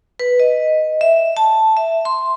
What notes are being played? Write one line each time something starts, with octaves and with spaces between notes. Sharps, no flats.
B4
D#5
E5
A5
E5
C6